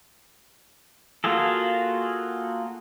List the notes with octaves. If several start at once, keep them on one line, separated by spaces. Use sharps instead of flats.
A#3 F4 F#4 G#4 A4